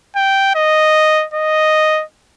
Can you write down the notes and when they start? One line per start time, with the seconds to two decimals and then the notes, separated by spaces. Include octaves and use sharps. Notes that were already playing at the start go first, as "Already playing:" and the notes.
0.16 G5
0.55 D#5
1.33 D#5